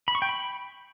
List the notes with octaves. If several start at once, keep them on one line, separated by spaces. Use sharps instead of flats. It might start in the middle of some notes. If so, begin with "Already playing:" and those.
B5
C#6
G5
B5